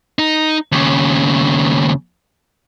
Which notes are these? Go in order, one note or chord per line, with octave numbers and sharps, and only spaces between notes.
D#4
D#2 C#3